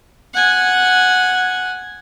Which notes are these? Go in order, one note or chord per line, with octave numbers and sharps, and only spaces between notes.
F#5 G#5